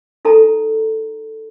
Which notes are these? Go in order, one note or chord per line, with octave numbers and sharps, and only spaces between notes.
D#4 A4 A#5